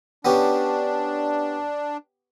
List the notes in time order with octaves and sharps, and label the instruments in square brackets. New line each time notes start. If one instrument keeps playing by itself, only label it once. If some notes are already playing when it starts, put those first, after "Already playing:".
[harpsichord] B3 C#4 G4 [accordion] D4